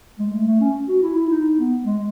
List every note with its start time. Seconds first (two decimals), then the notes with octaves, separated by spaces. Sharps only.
0.19 G#3
0.33 A3
0.47 A3
0.61 C#4
0.88 F#4
1.02 E4
1.16 E4
1.29 D#4
1.57 B3
1.85 G#3